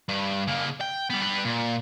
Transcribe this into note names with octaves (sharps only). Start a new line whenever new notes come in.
G2
C#3 A#3
G5
G3 B3
G3 B4
A#2